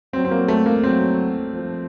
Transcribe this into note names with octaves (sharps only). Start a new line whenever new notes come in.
F#3 C4
C4
A#3
A3
A#3
F#3 C4
F3